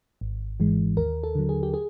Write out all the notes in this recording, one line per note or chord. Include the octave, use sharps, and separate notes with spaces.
G#1
G#2 E3 G#3
D#2 A#4
A4
D3 F#3
G#4
G4
G#4